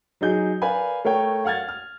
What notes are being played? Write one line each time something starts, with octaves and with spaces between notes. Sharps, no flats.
F#3 D#4 G#4 G6
A#4 B4 D5 F5 G#5 B5
A3 A#4 C#5 G5
F5 F#5 F6 G#6 A6
F6